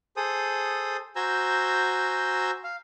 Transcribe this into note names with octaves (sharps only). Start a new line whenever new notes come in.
G#4 A4 C5 D#6
F#4 C5 G#5 A#5 E6 G6
F5